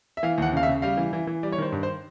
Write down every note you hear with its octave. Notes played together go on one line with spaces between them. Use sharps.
E5
E3 F5
D#2 F#5
C#3 F5
E5
C#3
G3 F5
E3
E3
E3
G3 D5
C#5
D#3 C5
G2
C5